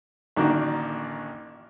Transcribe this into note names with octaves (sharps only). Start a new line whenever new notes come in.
A1 D3 D#3 A#3 D4 F#4